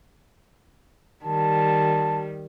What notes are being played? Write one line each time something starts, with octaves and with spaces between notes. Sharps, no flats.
D#3 G3 A5